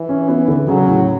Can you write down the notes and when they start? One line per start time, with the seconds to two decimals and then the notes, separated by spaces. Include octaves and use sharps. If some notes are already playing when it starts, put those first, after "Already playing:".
Already playing: E3
0.09 C#4
0.28 B3
0.48 D3
0.68 C#3 F#3
0.87 A2